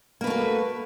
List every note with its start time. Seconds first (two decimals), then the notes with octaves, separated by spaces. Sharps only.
0.21 A#3
0.24 B4
0.27 A3
0.30 F#4